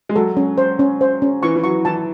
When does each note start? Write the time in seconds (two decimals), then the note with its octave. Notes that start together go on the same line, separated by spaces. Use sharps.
0.09 G#3
0.16 F#3 A4
0.37 C#4
0.58 C5
0.79 C#4
1.01 C5
1.22 C#4
1.43 E3 C#6
1.55 E3
1.64 F#3 C#6
1.85 E3 A5